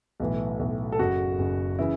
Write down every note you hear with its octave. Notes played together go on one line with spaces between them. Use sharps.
B1 A2 E3
B1 A2 E3
A4
F#1 F#2 C#3 F#4
F#1 F#2 C#3
C#3 E3 E4